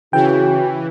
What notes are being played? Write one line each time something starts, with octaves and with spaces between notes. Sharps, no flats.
C#3 E3 F#4 G5